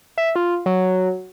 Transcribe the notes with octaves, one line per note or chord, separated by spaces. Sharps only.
E5
F4
F#3